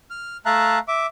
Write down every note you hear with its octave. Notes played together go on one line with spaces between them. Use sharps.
F6
A3 E5 F5 A5 A#5 F#6
E5 D6